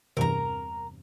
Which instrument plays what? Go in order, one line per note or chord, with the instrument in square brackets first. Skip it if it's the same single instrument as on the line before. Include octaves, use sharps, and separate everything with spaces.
[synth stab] E2 G2 C3 [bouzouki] A#4 A#5